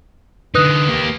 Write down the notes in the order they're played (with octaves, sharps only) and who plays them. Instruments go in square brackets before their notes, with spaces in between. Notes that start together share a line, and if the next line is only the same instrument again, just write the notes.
[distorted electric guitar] D3 D#4 [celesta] B4 D#6 F#6
[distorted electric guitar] A#3 G4